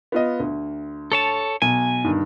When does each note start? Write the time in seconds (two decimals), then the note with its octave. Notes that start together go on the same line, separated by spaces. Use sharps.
0.12 B3 F4 D#5
0.40 D2
1.12 A4 C#5 A5
1.62 B1 G#5
2.04 G2 D3 D#3